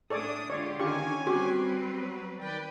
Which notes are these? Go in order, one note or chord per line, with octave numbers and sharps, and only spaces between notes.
A2 D4 A4 C#5 D5 D#6
D3 G#3 F4 G4 C#5 D5
D3 D#3 C#4 F4 G4 G#5 C#6
G3 C4 F#4 G4 B4
F#3
D#3 B4 D5 G5